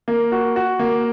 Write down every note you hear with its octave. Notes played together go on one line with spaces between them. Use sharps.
A#3
F#4
F#4
A#3